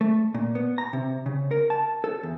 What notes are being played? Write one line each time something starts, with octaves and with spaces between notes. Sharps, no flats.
A3
A#2
B3
A#5
C3
C#3
A#4
A5
A4
E2